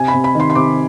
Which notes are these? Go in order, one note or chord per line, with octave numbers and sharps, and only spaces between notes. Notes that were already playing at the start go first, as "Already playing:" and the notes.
Already playing: C3 G#5
B5
C3
B5
D#3 C6
C6
C3 D6